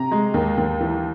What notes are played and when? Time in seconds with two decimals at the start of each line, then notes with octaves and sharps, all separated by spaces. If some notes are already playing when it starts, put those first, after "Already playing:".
Already playing: C3 A#5
0.11 G#3
0.34 D#2
0.57 D#2
0.80 E3